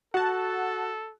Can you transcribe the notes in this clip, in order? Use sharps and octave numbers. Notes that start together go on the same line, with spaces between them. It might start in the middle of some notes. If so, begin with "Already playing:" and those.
F#4 A4 F#5 A5